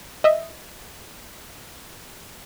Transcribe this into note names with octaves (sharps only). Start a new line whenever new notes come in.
D#5 E5